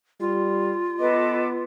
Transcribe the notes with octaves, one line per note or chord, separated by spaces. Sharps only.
G3 F4
B3 A4 B4 D#5 D6